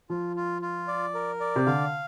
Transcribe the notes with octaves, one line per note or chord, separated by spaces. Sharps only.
F3 F4
F4
F4
D5
A#4
D5
C3
D3 F5